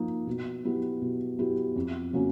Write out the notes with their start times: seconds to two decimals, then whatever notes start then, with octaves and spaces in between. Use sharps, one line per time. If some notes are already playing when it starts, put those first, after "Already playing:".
Already playing: F3 A#3 D#4
0.27 B2
0.64 F#3 B3 E4 G4
1.02 B2
1.39 F#3 B3 E4 G4
1.76 F2
2.13 C#3 F#3 A#3 C#4